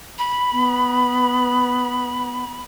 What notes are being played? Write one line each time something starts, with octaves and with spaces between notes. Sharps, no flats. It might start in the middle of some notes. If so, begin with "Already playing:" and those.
B5
B3